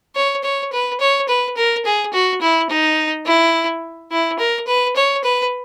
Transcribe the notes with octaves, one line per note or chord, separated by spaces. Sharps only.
C#5
C#5
B4
C#5
B4
A#4
G#4
F#4
E4
D#4
E4
E4
A#4
B4
C#5
B4